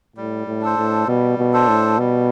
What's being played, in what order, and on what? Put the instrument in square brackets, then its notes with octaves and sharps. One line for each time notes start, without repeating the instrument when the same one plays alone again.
[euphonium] A2 [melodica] G3
[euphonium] A2
[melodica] D4 A4 C5
[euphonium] A2
[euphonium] B2 [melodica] G3
[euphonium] B2
[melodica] D4 A4 C5
[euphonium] A2
[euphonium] B2 [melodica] G3